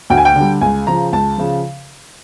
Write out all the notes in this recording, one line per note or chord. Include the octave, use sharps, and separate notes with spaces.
D2 G5
G#5
G5
D3 G3
C#2 G#5
C#3 F3 A#5
C#2 A5
C#3 F3